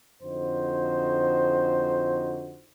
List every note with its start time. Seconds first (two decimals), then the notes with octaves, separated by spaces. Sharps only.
0.22 F2 D3 D#4 F#4 C5